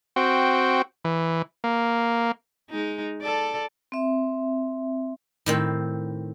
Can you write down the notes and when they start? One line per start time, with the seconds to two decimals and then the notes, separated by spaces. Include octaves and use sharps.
0.16 C4 F#4 G5
1.05 E3
1.64 A#3
2.71 G#3 D#4
3.22 A4 D5
3.92 C4 E5
5.46 A2 D#3 C4